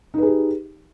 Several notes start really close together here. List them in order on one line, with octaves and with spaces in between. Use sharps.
D#4 B4 G#4 G4